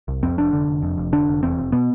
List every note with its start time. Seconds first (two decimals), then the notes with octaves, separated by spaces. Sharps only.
0.08 C2
0.23 F2 C4
0.37 F1 D4
0.53 D3
0.68 F1
0.83 F2
0.98 F1
1.12 D3 D4
1.28 F1
1.43 E2 C4
1.57 F1
1.72 B2 B3